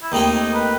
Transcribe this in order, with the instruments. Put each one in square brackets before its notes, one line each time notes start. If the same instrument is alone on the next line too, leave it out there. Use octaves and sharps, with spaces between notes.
[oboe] E4
[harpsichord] D#2 D#3 A3 C4 [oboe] D#4
[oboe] B4